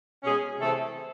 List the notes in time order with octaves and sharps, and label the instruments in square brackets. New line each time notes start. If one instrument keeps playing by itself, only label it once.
[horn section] B2 G#3 C#4 G#4
C3 E3 A3 C4 A4